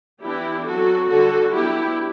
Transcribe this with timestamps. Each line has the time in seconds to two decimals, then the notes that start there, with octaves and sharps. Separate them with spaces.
0.23 E3 B3 D4 E4 G4
0.67 F#3 C4 F#4 A4
1.10 D3 G3 D4 F#4 A4
1.54 F#3 B3 D4 E4 G4